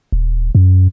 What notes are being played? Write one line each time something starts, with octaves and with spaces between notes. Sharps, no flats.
D#1
F#2